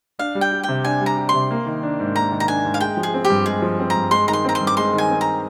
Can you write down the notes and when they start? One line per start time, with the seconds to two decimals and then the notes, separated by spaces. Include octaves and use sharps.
0.19 D4 F5
0.35 G3
0.41 G5
0.52 G4
0.63 G5
0.69 C3
0.85 D4 G#5
1.01 G3
1.06 A#5
1.17 G4
1.29 C3 C6
1.51 A#3
1.66 D#3
1.83 D4
2.00 G#2
2.15 A#3 A#5
2.32 D#3
2.40 A#5
2.48 D4 G#5
2.65 G#2
2.74 F5
2.80 G#3 G5
2.97 F3
3.03 G#4
3.14 C4
3.25 G4
3.30 G2
3.46 G#3 G#4
3.62 F3
3.80 C4
3.90 A#5
3.95 G2
4.11 G#3 C6
4.28 D#3 A#5
4.33 C6
4.45 C4 A#5
4.55 C6
4.61 G2
4.67 D6
4.77 G#3 C6
4.93 D#3 G#5
5.10 C4
5.21 A#5